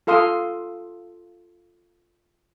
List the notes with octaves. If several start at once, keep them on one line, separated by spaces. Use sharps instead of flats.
F4 A4 F5 C6 D#6